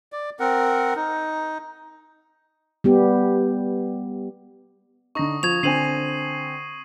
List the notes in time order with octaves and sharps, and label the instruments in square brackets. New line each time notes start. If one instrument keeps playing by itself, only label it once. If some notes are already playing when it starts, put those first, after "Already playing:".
[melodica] D5
C4 A#4 F#5
D#4
[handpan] G3 B3 G4
[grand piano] D3 D#4 [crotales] C#6 D#6 A#6
[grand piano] F3 [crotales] C#6 [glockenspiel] G#6 F7
[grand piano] D3 C4 G#5 [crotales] C7 D#7 F#7